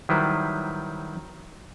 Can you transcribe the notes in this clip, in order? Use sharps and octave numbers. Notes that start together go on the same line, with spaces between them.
D#3 F#3 G3 E4 B4 C5